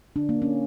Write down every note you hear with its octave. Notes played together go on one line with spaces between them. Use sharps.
D3 D4
A#3
D3
C#4